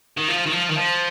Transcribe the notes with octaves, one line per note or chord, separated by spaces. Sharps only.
D#3
F3
D#3
F3
D#3
F3